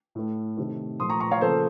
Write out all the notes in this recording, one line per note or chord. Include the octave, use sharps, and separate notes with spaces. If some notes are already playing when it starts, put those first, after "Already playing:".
A2 A3
C3 D#3 A3
A#2 F3 A3 C6 D#6
A#5 C#6
A#5 C#6
C#5 F5
C#3 F3 A#3 A4 C5